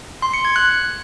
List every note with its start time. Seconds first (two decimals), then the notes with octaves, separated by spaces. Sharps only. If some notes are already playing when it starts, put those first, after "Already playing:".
0.22 C6
0.34 C#7
0.45 G#6
0.56 F#6